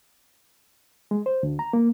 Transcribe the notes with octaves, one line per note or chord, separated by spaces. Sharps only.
G#3
C5
D2
A#5
A#3